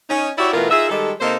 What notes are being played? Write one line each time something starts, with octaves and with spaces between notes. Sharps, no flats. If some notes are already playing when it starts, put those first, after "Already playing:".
C#4 D#4
E4 F#4 G4 C#5 D5 E5
B2 E3 A3 B3 F4 A#4
D#4 F4 G#4 E5
D#3 G3 G#3 G4 A4
C3 A#3 D#4 A4 C5